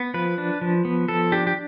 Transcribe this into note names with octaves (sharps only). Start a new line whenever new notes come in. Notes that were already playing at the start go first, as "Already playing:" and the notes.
Already playing: B3
F3 B4
D4
F3
B3
F3 A4
D4 G4
G4